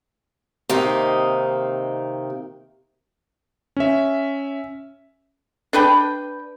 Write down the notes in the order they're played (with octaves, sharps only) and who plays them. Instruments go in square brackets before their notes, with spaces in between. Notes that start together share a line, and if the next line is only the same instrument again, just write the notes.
[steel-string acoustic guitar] C3 D#3 A#3 D#4
[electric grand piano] C#4 E5
[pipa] D4 B4 G5